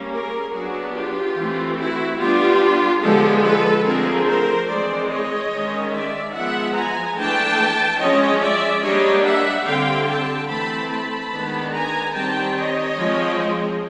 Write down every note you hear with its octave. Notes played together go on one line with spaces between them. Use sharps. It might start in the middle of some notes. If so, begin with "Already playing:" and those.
Already playing: G3 A#3 C#4
G#4 A#4
F#3 B3 D4 F#4 G#4
F4 G4
E3 A3 C4
E4 F#4
G3 B3 D4 F4 G4
D3 F3 G#3 B3 G4 A4
A4 B4
D3 F3 A3 C4 G#4 A#4
A#4 C5
E3 G#3 C4 C5 D5
C#5 D#5
D#3 G#3 C#4
D5 E5
F3 G#3 B3 E5 F#5
G#5 A#5
E3 A3 D4 G5 A5
F3 G#3 C#4 C#5 D#5
D5 E5
G3 A#3 D4 C#5 D#5
E5 F#5
D3 G3 C4 F5 G5
G5 A5
E3 A3 C4 A5 B5
A5 B5
D#3 G#3 B3 D4
G#5 A#5
D#3 G3 C4 G5 A5
C#5 D#5
F3 G#3 C4